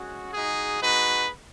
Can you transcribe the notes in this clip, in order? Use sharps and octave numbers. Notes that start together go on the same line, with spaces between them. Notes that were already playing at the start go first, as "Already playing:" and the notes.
Already playing: G#3 C#4 F#4
G#3 D#4 F#4 G#4
G#3 D#4 F#4 B4